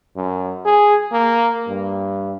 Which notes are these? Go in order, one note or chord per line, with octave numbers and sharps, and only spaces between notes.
F#2
G#4
A#3
G2